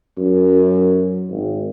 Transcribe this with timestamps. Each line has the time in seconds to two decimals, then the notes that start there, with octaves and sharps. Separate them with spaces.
0.17 F#2
1.30 G#1